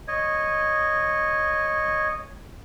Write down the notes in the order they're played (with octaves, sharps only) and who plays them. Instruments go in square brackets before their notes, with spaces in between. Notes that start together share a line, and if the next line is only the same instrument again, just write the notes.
[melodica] C#5 D#5